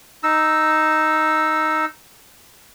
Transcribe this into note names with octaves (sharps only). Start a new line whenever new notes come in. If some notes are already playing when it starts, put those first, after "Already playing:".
D#4 E6